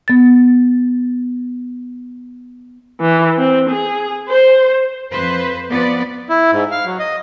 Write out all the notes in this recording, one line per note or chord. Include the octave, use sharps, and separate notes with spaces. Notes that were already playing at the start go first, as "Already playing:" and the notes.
B3 A6
E3
C4
G#4
C5
F2 B4 C5
F3 B3 B4 D5
E4
G#2
F5
F#3
D#5